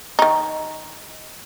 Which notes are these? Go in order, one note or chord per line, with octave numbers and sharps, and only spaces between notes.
D#3 D#4